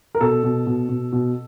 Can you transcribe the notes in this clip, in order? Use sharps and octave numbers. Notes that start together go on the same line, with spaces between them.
A#4
B2 A4
B2
B2
B2
B2